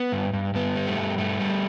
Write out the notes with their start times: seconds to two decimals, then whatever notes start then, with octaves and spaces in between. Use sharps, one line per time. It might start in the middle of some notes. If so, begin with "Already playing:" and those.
Already playing: B3
0.12 G2
0.33 G2
0.54 G2 B3
0.76 G3
0.87 A3
0.98 G2
1.18 G2 A3
1.40 G3